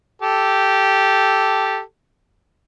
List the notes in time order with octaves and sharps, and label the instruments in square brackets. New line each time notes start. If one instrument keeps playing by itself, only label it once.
[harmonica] G4 A4